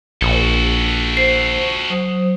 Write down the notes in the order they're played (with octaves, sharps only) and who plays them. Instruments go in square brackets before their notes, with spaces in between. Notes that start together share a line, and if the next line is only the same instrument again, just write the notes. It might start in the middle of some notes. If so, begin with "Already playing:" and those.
[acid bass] A#1 [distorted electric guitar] F#4 A4
[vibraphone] C5 [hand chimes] C7
[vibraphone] F#3 C5 D#6